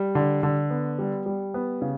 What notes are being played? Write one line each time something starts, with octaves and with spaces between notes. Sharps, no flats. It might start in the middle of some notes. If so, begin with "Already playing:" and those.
Already playing: G3
D3
D3
B3
G3
G3
B3
C#3